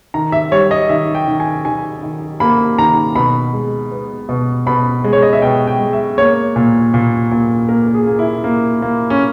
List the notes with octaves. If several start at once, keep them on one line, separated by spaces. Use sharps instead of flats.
D#3 A#5
E5
G3 C#5
D#5
D#3 E5
G5
D#3
G#5
D#3 G#5
D#3
A#3 B5
D#3 A#5
B2 B5
G#3
B3
B2
B2 B5
G#3
C#5
D#5
E5
B2 G5
G5
G#3
E5
A#3 C#5
A#2
A#2
A#2
A#3 A#4
A#4
G#4
A#3
E4
A#3
A#3
C#4